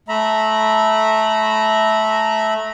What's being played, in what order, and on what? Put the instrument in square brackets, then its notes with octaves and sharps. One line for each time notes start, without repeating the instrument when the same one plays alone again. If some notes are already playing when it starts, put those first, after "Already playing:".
[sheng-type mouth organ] A3 E5 A#5 B5